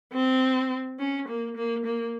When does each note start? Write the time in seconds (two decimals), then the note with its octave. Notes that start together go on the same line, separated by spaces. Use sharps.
0.13 C4
0.99 C#4
1.28 A#3
1.56 A#3
1.85 A#3